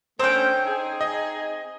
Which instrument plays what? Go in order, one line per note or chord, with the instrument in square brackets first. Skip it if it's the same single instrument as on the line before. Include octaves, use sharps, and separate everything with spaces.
[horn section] D3 A3 C#4 [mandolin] C4 G5 [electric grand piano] C5
[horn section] D#4 G#4
[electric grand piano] D#5